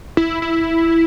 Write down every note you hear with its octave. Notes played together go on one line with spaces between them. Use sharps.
E4
E4